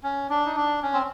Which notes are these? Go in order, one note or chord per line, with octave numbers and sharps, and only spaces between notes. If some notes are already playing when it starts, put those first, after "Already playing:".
C#4
D4
D#4
D4
C#4
C4